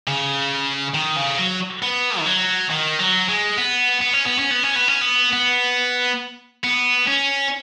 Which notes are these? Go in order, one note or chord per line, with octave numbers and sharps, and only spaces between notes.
C#3
D#3
C#3
F#3
B3
D#3
F#3
D#3
F#3
G#3
B3
B3
C#4
B3
C#4
B3
C#4
B3
C#4
B3
B3
B3
C#4